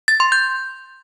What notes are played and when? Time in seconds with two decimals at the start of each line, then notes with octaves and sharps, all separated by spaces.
0.08 A6
0.20 C6
0.32 G6